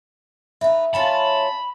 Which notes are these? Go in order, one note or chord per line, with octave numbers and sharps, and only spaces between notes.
D#4 B4 E5
F#3 C#4 F4 A5 B5